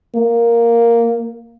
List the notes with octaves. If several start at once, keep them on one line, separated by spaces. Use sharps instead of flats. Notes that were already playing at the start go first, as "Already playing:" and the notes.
A#3